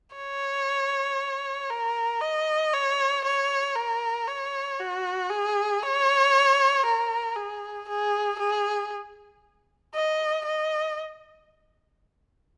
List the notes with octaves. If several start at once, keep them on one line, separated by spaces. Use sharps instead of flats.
C#5
A#4
D#5
C#5
C#5
A#4
C#5
F#4
G#4
C#5
A#4
G#4
G#4
G#4
D#5
D#5